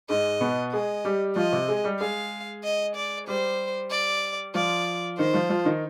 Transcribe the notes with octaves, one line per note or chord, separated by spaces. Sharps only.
G#2 G#3 D#5
B2 B3
G#3 G#4 D#5
G3 G4
F3 F4 D#5
C3 C4
G#3 G#4
G3 G4
G#3 G#4 F5
D#5
D5
G3 G4 C5
D5
F3 F4 D5
D#3 D#4 C5
F3 F4
F3 F4
D#3 D#4